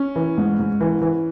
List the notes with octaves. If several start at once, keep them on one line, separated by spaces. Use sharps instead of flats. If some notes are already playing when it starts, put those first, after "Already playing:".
Already playing: C#4
E3
G#2
G#2
E3
E3